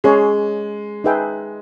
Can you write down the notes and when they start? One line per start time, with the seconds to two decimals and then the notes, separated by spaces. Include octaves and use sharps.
0.04 G#3 C#4 G#4 C#5
1.04 D#4 G#4 B4 E5 G5